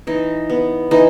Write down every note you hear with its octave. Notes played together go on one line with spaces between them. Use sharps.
E3 D#4
B3
E3 D#4